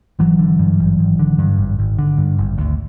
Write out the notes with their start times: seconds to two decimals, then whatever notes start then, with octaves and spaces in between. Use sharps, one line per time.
0.19 G#1 E3 F#3
0.39 D3
0.59 G2
0.79 G#1
0.99 G#1
1.19 D3
1.38 G2
1.58 G#1
1.79 G#1
1.98 D3
2.18 G2
2.38 G#1
2.58 D2